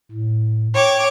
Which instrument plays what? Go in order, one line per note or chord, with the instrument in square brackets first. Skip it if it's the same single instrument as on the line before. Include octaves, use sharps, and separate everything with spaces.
[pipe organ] A2
[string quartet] C#5 D6 [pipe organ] G5